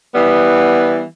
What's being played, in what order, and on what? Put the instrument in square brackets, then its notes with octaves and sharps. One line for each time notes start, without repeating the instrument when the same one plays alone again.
[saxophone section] E3 G3 B3